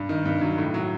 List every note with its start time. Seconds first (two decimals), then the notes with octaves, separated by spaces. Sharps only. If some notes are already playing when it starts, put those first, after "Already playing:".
Already playing: G2
0.09 D#3
0.25 G2
0.41 F#3
0.58 A2
0.74 F#3